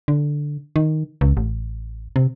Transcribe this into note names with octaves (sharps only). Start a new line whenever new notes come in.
D3
D#3
C#2
A1
C3